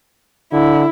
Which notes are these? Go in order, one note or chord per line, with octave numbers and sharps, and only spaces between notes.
D3 E4